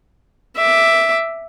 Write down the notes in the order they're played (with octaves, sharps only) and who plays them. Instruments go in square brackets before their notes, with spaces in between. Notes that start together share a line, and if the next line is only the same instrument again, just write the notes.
[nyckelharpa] E5 D6